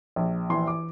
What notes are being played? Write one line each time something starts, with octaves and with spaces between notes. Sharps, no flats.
A#1
E3 C6
D6